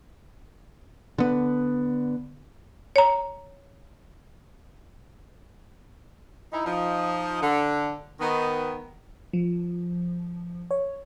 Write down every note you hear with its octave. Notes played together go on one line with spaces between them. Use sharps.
D3 B3
C#5 A#5
D#4 E4
F3 D#4
D3
D#3 B3
F3
C#5